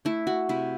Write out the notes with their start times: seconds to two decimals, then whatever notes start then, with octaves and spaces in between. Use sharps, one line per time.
0.05 A3 E4
0.27 F#4
0.49 C3 E4